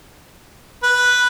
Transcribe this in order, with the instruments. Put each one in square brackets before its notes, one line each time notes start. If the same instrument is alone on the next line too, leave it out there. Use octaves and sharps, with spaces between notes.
[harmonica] B4